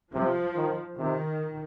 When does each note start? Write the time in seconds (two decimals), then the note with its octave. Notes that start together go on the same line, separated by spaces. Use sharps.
0.13 C3 F3
0.56 D#3
0.98 C3 D#3